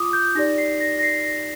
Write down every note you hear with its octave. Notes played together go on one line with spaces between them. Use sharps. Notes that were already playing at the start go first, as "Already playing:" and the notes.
Already playing: F4 D6 D#6
G6
D#4 G4 D5 A#6
C7
A#6
A#6
C7
A#6